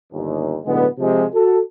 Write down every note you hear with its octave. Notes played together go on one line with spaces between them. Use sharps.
G1 D#2
B1 A2 D3 G#3 B3
C3 F3 G#3
F#4 A4